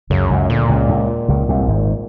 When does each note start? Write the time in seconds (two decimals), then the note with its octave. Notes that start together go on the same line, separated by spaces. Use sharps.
0.10 C#2 F#2 C#3
0.30 C#2 C#3
0.49 D2 A#2 D3
0.69 C#2 C#3
0.89 C#2 C#3
1.28 C#2 C#3
1.48 C2 C3
1.60 A2
1.68 G#1 G#2